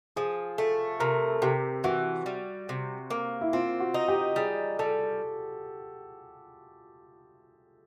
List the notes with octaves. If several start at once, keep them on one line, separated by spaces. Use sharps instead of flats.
F3 G#4
A3 A4
C3 A#4
C3 G4
E3 F#4
G3
C3
A#3
E4
C4 F4
F#4
D#4
G4
G3 G#4
G3 A4